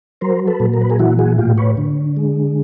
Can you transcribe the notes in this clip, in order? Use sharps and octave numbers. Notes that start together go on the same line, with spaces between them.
F#3 A#4 C5
A4 B4
A#2
A#4
B4
G#4 A#4
E3 E4 F#4
F#4 G#4
A2 F4 G4
B4 C#5
D3
G#3